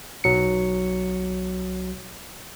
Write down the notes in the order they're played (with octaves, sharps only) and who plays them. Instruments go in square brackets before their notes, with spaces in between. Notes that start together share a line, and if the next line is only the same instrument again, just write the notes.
[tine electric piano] B1 F#3 C#7